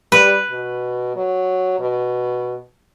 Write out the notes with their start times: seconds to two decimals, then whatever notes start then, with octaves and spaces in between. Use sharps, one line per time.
0.12 G3 B4
0.50 B2
1.16 F#3
1.79 B2